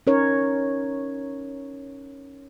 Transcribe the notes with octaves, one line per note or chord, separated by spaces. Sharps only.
C#4 D#4 A#4 C#5